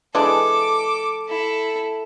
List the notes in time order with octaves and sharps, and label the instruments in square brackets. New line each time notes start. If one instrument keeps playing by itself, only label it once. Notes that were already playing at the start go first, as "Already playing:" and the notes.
[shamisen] E3 G#3 D4 [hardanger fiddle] A4 D6
[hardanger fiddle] E4 A4